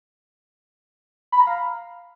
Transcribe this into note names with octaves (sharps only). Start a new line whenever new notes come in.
B5
A#5
F5